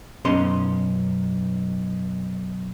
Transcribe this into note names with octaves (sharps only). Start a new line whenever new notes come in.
B1 F#2 C#4 D#5 C6